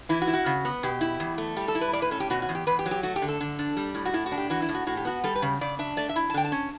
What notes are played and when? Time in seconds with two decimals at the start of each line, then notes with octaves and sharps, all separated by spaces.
0.09 E3 E4
0.22 F#4
0.27 E4
0.33 F#4
0.46 C#3
0.65 B3
0.83 B2 G4
1.01 E4
1.20 E2
1.38 A3
1.56 G3 G4
1.68 A4
1.75 E4
1.81 B4
1.93 A2 D5
2.02 B4
2.11 C#4 A4
2.20 G4
2.30 B2 F#4
2.42 F#4
2.49 E2
2.55 G4
2.67 E2 B4
2.79 G4
2.86 F#3
2.91 G4
3.03 A3 F#4
3.16 G4
3.22 D3
3.28 A4
3.41 D3
3.59 D4
3.77 G3
3.95 A2
4.05 F#4
4.13 A2 E4
4.26 F#4
4.32 D4
4.38 G4
4.50 E3 F#4
4.62 E4
4.69 A2
4.75 F#4
4.87 A2 F#4
4.97 G4
5.05 B3 F#4
5.24 G3 A4
5.36 B4
5.42 C#3
5.61 C#3 D5
5.79 D4 E5
5.97 A3 D5
6.09 E5
6.16 E4
6.30 A5
6.34 D3 G5
6.45 A5
6.52 C#4